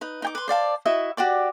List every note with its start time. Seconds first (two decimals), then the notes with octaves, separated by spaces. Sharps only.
0.01 D#4 B4
0.22 D#4 G5 D6
0.35 B4 C6
0.48 C5 D5 F5 A5
0.86 E4 F#4 D#5 E5
1.17 F#4 G4 D5 D6